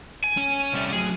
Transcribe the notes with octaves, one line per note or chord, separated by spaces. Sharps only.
G#5
C#4
C3 G3 A3
A2 F#3 G#4